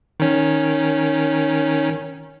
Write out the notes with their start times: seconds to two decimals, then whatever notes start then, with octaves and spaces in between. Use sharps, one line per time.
0.20 D#3 C#4